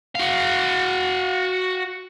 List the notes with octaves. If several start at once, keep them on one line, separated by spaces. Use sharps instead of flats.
F#4 F5